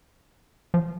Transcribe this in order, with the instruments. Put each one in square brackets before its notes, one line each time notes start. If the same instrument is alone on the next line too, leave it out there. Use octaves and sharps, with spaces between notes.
[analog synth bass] F3